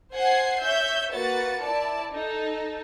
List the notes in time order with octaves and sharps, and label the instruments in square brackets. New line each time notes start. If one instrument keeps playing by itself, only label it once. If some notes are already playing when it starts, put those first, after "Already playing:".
[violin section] C5 F#5 G#5 G#6 C7
C#5 E5 G6
A#3 F#4 B4 A6 C#7
E4 D5 A5
D#4 A4